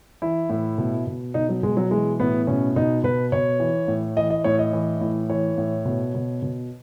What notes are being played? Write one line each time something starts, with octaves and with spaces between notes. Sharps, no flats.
E3 E4
A2
B2
B2
B2 D#4
F#3
B2 G#3
F#3
E3 G#3
A2 B3
B2 C#4
B2 D#4
B2 B4
B2 C#5
E3
A2
E3 D#5
D#5
A2 C#5
D#5
E3
A2
E3 C#5
A2
B2
B2
B2